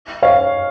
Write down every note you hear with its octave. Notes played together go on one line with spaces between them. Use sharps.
C#5 F5